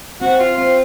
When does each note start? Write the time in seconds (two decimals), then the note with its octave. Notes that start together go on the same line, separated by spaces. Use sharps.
0.21 C4 F#4
0.39 F4
0.57 C4 F4